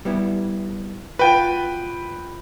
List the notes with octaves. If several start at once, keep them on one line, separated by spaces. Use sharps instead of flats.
G3 B3 E4
F4 F#4 B4 G5